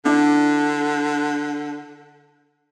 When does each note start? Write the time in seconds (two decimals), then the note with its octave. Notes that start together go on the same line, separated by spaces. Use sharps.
0.05 D3 D4 E4